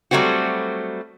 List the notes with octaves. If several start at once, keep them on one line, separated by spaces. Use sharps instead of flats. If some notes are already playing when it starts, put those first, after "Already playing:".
F#3 G3 A3 B3 C4 F#4